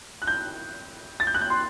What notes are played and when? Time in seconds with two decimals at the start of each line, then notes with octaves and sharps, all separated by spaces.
0.22 F#6
0.27 G6
1.20 A6
1.27 G6
1.34 F#6
1.41 G6
1.50 C6